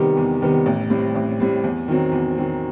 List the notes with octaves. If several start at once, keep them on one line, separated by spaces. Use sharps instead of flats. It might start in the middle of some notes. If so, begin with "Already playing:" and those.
Already playing: C3 D#3 G3 B3
E2
C3 D#3 G3 B3
A1
A2 G3 C4
A1
A2 G3 C4
E2
D#3 F#3 C4
E2
D#3 F#3 C4